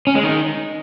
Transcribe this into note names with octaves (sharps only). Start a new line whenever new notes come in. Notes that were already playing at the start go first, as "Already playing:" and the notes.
C#4
G#3
D#3